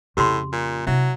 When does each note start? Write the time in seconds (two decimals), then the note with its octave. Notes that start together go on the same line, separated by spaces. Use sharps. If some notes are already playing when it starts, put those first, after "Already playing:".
0.17 F2 A2 C#3 G4 C6
0.52 A#2
0.87 C3 F#3 E4 E5